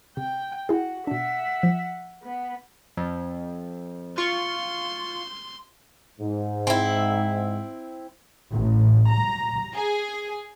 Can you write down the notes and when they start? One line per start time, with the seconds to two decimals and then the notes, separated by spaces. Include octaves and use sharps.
0.17 C3 G5
0.69 E4 F#4 G#4
1.07 B2 D4 E5 F#5
1.63 F3
2.23 B3
2.97 F2
4.18 F4 C6 C#6
6.20 G#2
6.67 C4 E4
8.50 A1
9.08 A#5
9.74 G#4